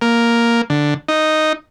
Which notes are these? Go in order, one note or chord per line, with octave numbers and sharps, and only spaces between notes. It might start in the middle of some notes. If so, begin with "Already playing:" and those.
A#3
D3
D#4